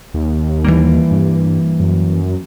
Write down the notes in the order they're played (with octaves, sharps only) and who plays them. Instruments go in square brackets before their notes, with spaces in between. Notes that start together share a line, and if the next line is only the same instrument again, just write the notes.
[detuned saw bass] D#2
[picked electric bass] E3 G3 A#3
[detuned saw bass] G2
F#2